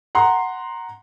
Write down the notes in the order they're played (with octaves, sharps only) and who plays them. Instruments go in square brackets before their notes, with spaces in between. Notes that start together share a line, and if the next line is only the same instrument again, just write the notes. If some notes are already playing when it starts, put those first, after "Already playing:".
[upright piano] F#5 A#5 C6